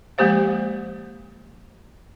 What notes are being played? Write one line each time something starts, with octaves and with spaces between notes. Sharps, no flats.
F3 G#3 A#3 G4 C5 F5